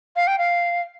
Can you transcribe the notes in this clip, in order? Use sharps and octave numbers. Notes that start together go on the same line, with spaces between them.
F5
G5
F5